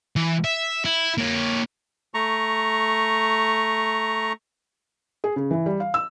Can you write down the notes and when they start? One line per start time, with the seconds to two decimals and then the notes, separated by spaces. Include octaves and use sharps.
0.16 E3
0.44 E5
0.85 E4
1.18 A#3 C#5
2.14 A3 A#5 C#6
5.24 G#4
5.36 C#3
5.51 E3
5.66 G3
5.80 F5
5.94 E6